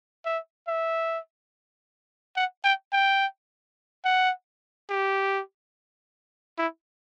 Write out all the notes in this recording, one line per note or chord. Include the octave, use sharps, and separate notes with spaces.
E5
E5
F#5
G5
G5
F#5
G4
E4